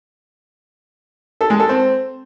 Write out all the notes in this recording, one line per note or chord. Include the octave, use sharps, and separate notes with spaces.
A4
G#3
A4
C4